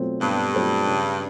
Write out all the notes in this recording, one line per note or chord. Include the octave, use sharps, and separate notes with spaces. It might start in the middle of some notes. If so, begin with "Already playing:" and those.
Already playing: B2 F#3 A3 C4 F4
G2 B2
F#3 A3 C4 F4
C#3